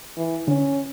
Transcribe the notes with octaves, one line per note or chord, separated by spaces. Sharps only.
E3
D3 C#4